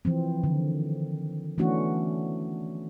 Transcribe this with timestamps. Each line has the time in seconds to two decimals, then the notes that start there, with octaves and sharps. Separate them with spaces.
0.05 E3 F3 C4
0.44 D3 D#3
1.58 E3 A3 B3 C#4 D4 F#4